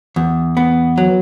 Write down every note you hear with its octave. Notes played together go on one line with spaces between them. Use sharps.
E2
B3
F#3